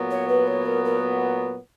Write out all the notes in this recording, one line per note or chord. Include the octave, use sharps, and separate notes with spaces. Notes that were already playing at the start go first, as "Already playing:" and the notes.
Already playing: A#2 F#3 B3
C#5
B4
C#5
A#4
A#4